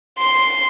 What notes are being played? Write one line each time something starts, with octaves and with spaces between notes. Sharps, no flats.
C6